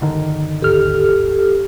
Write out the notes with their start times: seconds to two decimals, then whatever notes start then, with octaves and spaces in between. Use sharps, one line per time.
0.01 G1 D3 D#3
0.62 G#1 D#2 G4 A4 F6